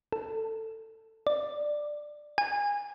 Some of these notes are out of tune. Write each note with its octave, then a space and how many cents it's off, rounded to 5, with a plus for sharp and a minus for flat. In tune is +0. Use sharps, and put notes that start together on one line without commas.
A4 +15
D5 +10
G#5 -25